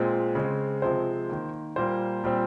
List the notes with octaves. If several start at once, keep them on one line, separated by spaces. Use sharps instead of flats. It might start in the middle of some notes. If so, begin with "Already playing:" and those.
Already playing: A#2 G#3 C4
C#3 G#3 C4
C3 F3 G#3 C4 C5
D#3 A#3
A#2 G3 A#3 C5
A#2 G3 C4